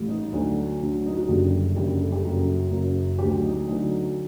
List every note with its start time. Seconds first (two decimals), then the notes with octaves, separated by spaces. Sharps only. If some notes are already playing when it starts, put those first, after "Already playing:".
Already playing: A1 A2 G3
0.08 D#4
0.32 D2 D3 F#3
0.80 D2 D3 F#3
1.06 D#4
1.17 F#4
1.28 F#1 F#2 D3 G3 G4
1.75 F#1 F#2 D3 G3 G4
2.00 A4
2.12 G4
2.24 F#1 F#2 F#3 A4
2.71 F#1 F#2 F#3
3.19 D2 D3 F#3 G4
3.43 D#4
3.67 D2 D3 F#3 D#4